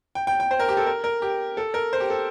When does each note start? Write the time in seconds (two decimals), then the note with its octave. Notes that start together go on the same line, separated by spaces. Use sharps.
0.15 G5
0.27 G5
0.40 G5
0.51 C5
0.60 A#4
0.69 G4
0.77 A4
0.86 A#4
1.04 A#4
1.22 G4
1.57 A4
1.74 A#4
1.93 C5
2.00 G4
2.10 A4